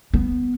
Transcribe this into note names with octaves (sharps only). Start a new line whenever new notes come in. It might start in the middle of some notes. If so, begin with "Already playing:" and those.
B3